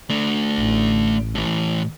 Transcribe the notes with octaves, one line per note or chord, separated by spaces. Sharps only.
A3 D4
A1
A2 E3